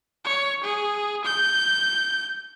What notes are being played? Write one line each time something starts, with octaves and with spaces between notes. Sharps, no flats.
C#5
G#4
G6